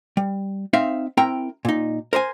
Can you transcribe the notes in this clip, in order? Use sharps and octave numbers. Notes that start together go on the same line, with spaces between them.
G3
C4 D#4 E5 F5
C4 E4 A#4 G5 A#5
A#2 D#4
A#4 C5 D#5 G#5